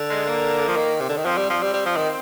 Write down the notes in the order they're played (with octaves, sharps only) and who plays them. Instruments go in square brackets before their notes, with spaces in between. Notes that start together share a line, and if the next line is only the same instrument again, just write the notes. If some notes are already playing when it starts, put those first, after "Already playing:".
Already playing: [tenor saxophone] D3
[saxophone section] G#3
A#3
[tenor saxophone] F3
D#3
C3
D3
D#3
[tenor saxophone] F3 [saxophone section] C4
[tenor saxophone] G3
F3
G3
G3
F3
D#3